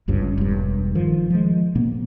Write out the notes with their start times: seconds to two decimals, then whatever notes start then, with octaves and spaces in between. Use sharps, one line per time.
0.08 G1 C#2 G2 C#3
0.38 E1 G2
0.95 D#3 F3
1.30 F3 G#3
1.75 A#2 A#3 B3